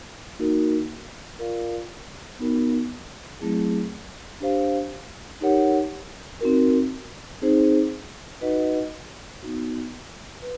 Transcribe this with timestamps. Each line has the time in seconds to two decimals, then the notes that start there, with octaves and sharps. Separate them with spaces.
0.39 A#3 D#4 F#4 A#4
1.39 F4 A#4 D5 F5
2.39 B3 D#4 F#4 A#4
3.41 F#3 A3 C4 E4 G#4
4.40 D4 G4 C5 F5
5.41 D#4 G4 A#4 C#5 F#5
6.41 C4 D#4 F#4 A#4
7.42 C4 D#4 G#4 C5
8.41 D#4 F#4 B4 D#5 F#5
9.42 B3 D#4 F#4
10.42 B4